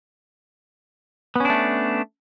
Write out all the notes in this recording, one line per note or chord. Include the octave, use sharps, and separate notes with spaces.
A3 B3 C#4 D4